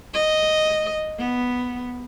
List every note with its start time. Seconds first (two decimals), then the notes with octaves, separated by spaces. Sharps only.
0.14 D#5
1.19 B3